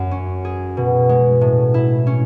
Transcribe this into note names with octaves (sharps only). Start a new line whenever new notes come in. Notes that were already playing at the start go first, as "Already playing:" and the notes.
Already playing: F#2
C#4
G#4
B2
G#3
A2
E4
C#4